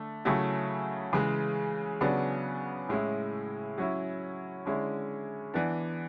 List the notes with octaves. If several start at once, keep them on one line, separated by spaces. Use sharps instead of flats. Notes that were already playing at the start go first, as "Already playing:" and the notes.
Already playing: D3 A3
C#3 F#3 A3 E4
C#3 E3 G#3
C#3 F#3 B3 D4
A2 G#3 C#4 E4
F#3 C#4 E4
D3 G#3 C#4 E4
E3 B3 D4